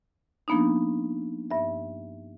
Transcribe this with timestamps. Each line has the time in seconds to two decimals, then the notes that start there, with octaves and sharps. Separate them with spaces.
0.48 F3 A#3 B3 D4 D#4
1.51 G2 E5